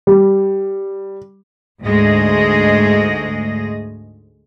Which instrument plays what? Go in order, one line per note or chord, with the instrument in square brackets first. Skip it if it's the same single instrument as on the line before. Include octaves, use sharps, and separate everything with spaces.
[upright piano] G3
[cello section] D2 G#2 G#3 A3 G#4 D#5